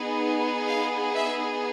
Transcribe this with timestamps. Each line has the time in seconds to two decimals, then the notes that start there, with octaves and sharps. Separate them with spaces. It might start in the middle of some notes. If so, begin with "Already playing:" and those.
Already playing: B3 D#4 G#4
0.68 F5
1.15 E5